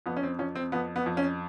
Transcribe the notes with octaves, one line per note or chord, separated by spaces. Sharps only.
F2 B3
C#4
C4
F2 C#4
C4
F2 B3
B3
F2
C#4